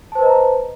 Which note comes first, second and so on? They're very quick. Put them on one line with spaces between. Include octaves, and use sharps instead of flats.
A5 C5 B4 D#5 A#5